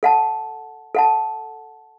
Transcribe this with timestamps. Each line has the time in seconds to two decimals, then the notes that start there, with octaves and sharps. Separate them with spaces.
0.03 A4 F#5 A5
0.95 A4 F#5 A5